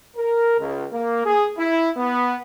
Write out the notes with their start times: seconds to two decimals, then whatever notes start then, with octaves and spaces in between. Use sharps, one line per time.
0.17 A#4
0.59 C#2
0.93 A#3
1.26 G#4
1.58 E4
1.97 B3